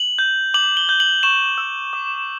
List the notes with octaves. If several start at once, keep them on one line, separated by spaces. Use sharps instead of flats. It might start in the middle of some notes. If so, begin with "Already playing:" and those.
Already playing: F#7
G6
D6 F#7
G7
G6
F#7
C#6 E7
E6
D6